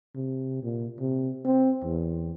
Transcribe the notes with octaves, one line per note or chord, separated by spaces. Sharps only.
C3
A#2
C3
C4
E2